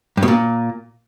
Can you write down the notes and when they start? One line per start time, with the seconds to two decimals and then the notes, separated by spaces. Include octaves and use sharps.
0.17 G2
0.23 B2
0.28 A#2